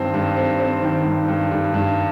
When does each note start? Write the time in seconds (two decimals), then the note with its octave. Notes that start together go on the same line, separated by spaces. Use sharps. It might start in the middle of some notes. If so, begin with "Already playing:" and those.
Already playing: G2 D#3 C4
0.14 G2
0.37 C4
0.60 C4
0.82 D#3
1.05 G2
1.28 G2
1.51 G2
1.74 G2